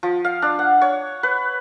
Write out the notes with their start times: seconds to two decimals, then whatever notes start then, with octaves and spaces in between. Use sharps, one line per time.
0.03 F3
0.25 F5
0.42 D4
0.59 F#5
0.81 C#5
1.23 B4